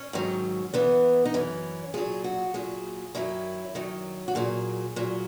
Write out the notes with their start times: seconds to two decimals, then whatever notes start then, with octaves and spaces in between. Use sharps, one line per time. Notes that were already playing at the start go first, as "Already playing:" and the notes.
Already playing: C#4
0.13 G#2 D#3 F#3
0.74 F#2 E3 B3
1.25 D#4
1.34 F#2 E3 C#4
1.94 A#2 F#3 G#4
2.24 F#4
2.54 A#2 F#3 G#4
3.15 F#2 D#3 F#3 E4
3.75 F#2 D#3 F#3
4.28 F#4
4.35 A#2 F#3 G#4
4.96 A#2 F#3